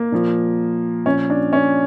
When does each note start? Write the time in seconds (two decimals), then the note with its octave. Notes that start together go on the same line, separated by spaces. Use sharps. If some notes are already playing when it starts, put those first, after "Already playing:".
Already playing: A#3
0.12 A#2 F3
1.06 A#2 C#4
1.09 F3
1.30 D4
1.53 C#4